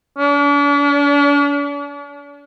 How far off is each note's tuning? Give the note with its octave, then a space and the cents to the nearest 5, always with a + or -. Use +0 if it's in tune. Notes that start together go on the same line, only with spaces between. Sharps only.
D4 -45